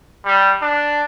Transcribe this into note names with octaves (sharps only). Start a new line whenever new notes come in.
G3
D4